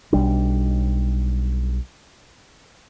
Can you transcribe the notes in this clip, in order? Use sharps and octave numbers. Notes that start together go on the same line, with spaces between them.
B1 G3 D4